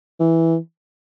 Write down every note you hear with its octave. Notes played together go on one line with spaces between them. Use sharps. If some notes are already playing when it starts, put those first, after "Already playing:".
E3